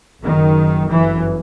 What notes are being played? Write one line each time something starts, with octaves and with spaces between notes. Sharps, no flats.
F#1 F#2 D#3
G1 F#2 E3